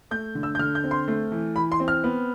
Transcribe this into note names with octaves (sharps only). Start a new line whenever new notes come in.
A3 G6
D3
E6
G6
D3 F6
G6
C4
C6
A3
E3
E3 B5
C6
C4
F6
B3